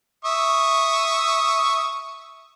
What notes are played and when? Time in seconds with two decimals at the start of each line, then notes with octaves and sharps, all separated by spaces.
0.25 E5 C#6 D#6